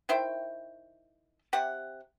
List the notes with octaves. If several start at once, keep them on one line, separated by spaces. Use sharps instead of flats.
D#3 E4 C5 G5
C3 G4 F#5